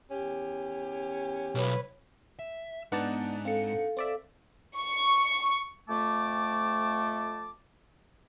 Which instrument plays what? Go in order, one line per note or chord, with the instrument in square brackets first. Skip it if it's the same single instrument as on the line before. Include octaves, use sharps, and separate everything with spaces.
[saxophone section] E2 C#4 G4
[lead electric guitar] B1 [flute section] B4 C#5
[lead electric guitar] E5
[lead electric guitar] G#2 [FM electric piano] B3 D5 A5 [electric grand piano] D4 D#4 F#5
[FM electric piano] C4 C#7 [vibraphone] A4 F5
[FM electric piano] C4 D5 E5
[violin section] C#6
[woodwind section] F2 A3 A5 D6